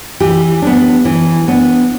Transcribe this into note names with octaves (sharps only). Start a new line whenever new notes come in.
E3 G4
B3 D4
E3
B3 D4